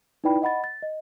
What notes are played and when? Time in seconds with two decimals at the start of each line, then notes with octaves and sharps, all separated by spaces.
0.24 D#4 E4 B4 D5 G5 B5
0.42 D#5 F#5 B5 A6
0.64 A6
0.82 D#5